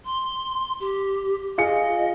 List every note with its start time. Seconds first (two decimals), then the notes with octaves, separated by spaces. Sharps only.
0.05 C6
0.80 G4
1.58 F4 G#4 D#5 C#7